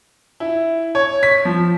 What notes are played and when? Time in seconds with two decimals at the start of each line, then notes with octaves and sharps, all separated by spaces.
0.40 E4
0.95 C#5
1.23 B6
1.45 F3